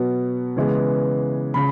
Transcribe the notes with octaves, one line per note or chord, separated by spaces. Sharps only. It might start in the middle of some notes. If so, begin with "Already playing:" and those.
Already playing: B2 F#3 B3
C#3 E3 G#3 B3
C#3 B5